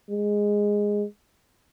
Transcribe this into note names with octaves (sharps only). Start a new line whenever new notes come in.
G#3